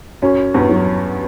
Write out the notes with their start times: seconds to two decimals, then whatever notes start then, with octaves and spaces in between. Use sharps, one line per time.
0.22 F#2 C#4
0.54 E2 G2
0.69 F#3